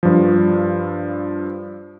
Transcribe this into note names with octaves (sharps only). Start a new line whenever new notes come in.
G2 F3